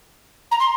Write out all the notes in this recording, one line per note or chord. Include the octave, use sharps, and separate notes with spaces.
A#5
C6